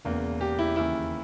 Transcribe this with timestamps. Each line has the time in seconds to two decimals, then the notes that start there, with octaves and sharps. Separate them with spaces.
0.05 E1 E2 C#3 A#3
0.41 G4
0.59 E4
0.76 D#2 C#3 E3 E4